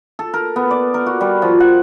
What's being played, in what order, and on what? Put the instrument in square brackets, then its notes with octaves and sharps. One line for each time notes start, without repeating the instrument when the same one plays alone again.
[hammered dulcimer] A4
A#4
B3
D5
A#4
F#4
G3
F3
F#5